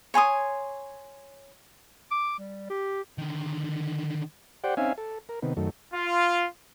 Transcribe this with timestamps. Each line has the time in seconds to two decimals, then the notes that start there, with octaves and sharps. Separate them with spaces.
0.14 C#5 G#5 C6 D#6
2.11 D6
2.39 G3
2.70 G4
3.18 D3 D#3
4.64 G4 C5 D5 F#5 G5
4.77 C4 C#4 D#4 E5 F5 G#5
4.98 A4
5.29 A#4
5.42 C3 D#3 B3
5.57 F#2 D#3 A3
5.94 F4